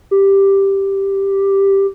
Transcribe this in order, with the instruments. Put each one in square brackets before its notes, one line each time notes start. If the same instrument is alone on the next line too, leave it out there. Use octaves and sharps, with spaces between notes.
[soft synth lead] G4